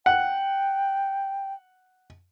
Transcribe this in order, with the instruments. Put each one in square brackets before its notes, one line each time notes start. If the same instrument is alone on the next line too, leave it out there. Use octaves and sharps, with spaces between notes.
[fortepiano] F#5 [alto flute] G5